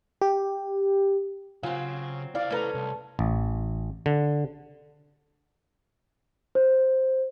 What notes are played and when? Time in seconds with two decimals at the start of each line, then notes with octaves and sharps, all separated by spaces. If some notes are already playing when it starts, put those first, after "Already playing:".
0.21 G4
1.63 C#3 F#3 C4 F4 F5 G#5
2.35 E4 C5 D5 F5
2.51 A3 C#4 A4 B4 A#5
2.74 C2
3.19 A1
4.06 D3
6.55 C5